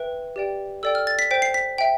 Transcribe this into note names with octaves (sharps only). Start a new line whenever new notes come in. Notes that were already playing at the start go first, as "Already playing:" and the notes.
Already playing: B4 E5 G5
G4 D5 G5
A4 D5 G5 E6
F6
A6
B6
C5 G5 B6
C7
B6
E5 G5